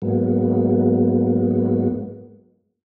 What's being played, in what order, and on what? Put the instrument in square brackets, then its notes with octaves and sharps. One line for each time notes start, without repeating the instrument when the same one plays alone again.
[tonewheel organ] G#2 F#3 G#3 A#3 B3